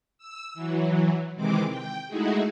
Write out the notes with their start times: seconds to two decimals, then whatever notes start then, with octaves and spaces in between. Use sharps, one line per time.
0.18 E6
0.54 E3 F#3
1.35 C3 D#3 E3 G#3 C4 D6
1.69 G5
2.08 G#3 A3 D#4 E4 F#4 G#4